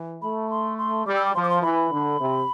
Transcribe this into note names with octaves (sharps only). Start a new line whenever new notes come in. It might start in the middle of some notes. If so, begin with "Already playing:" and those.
Already playing: E3
A3 B5
C6
C6
G3 D6
E6
D6
F3 C6
D6
C6
E3 B5
D3
C3